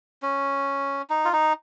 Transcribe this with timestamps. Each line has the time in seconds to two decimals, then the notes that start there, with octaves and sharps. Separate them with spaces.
0.22 C#4
1.10 D#4
1.25 F4
1.33 D#4